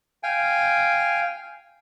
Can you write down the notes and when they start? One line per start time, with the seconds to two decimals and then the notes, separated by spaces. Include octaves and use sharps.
0.23 F5 G5 G#5